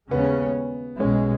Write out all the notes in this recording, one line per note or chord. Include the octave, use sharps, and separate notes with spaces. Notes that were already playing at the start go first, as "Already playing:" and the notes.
D#2 C#3 G#3 B3 C#4
B1 B2 G#3 C#4